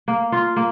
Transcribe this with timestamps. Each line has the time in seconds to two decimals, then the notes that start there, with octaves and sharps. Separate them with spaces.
0.08 A#3
0.32 F4
0.56 A#3